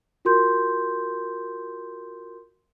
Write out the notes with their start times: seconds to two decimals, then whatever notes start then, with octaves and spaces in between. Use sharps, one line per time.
0.25 F4 F#4 A#4 C6 G6